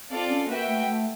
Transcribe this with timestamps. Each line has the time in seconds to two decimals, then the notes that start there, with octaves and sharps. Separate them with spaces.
0.10 C4 F4 A4 D5 F5
0.30 C#4
0.48 A#3 F#4 B4 E5 G5
0.67 A3
0.86 A3